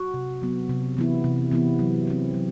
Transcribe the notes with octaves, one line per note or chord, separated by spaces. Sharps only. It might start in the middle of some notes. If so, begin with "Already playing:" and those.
Already playing: F#4
C3
F#3 B3
C3
E3 B3 E4
C3
E3 B3 E4
F#3
C4 E4
F#3